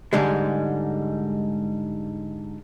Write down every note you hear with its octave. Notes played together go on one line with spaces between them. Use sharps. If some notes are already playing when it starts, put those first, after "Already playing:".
G#2 D3 G3 G#3